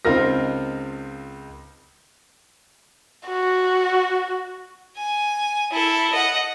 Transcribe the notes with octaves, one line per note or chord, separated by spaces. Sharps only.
C#2 C4 D#4 F4 A#4 A#6
F#4
G#5
E4 A4
D#5 F#5